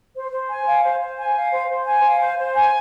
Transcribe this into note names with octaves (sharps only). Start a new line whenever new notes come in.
C5
C5
G#5
F5
C5
C5
G#5
F5
C5
C5
G#5
F5
C5
C5
G#5